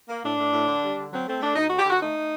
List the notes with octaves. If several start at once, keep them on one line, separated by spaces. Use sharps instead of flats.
A#3
A2 D4
A2
A2
D3
G3
D3
F#3 C4
A3 C4
A3 D4
D2 D#4
D3 F#4
G4
D3 F#4
A3 D#4
A3